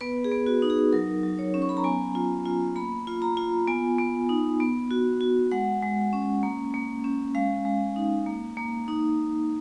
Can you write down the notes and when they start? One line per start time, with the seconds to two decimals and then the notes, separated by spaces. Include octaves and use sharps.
0.01 B3 B4
0.24 G#4
0.31 B3
0.46 F#4
0.62 D#4
0.70 G#4
0.93 F#3 A#4
1.23 F#3
1.39 C#5
1.54 C#4
1.62 C#6
1.69 B5
1.77 A#5
1.84 B3 G#5
2.15 F4
2.46 F4
2.76 A#3 B5
3.07 F4
3.22 A#5
3.37 F4
3.68 B3 G#5
3.99 B3
4.29 D#4
4.60 B3
4.91 F#4
5.21 F#4
5.51 G#3 F#5
5.82 G#3
6.13 C#4
6.43 A#3
6.74 A#3
7.04 C#4
7.34 G#3 F5
7.65 G#3
7.96 D#4
8.27 A#3
8.57 A#3
8.88 D#4